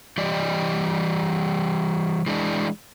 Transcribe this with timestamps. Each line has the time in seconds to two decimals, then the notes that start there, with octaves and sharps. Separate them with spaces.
0.18 E3 G3 G4 D5 D#5
2.27 E3 G#3 D4